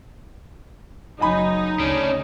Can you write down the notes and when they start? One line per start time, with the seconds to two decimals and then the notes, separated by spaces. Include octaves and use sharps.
1.20 F#1 F#3 D#4 D#5 G#5 B5
1.80 D2 C#3 C#4 D4